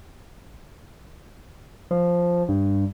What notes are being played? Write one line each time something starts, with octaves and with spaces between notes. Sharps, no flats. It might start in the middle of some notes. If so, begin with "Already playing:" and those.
F3
G2